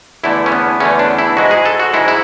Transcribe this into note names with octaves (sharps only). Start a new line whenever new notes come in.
E2 D3 A3 E4
C#4
B3
E2 D3 A3 C#4
D4
E4
G#2 G#3 F#4
G#4
A4
F#4
G#2 G#3 E4
E4